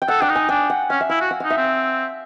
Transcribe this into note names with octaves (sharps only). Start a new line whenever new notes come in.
G5
A4 F#5
D4 G5
D#4
G#5
D4 G5
F#5
C#4 F5
E5
E4 F5
F#4
F#5
D#4 F5
E5
C4